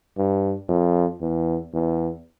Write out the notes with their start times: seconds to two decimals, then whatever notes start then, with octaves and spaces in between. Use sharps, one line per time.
0.17 G2
0.69 F2
1.21 E2
1.73 E2